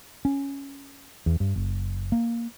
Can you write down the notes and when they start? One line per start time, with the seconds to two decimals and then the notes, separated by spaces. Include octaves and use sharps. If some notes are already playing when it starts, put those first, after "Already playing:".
0.25 C#4
1.26 E2
1.40 G2
1.56 F#1
2.12 A#3